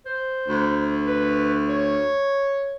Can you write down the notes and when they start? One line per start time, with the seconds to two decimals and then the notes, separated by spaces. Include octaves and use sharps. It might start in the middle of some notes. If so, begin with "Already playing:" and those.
0.06 C5
0.49 D2
1.07 B4
1.69 C#5